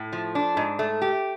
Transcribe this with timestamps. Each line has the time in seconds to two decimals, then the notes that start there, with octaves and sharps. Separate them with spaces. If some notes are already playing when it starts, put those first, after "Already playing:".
Already playing: A2
0.13 F3
0.35 D4
0.57 G#2
0.79 A3
1.02 G4